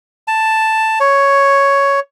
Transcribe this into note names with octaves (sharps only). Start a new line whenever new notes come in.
A5
C#5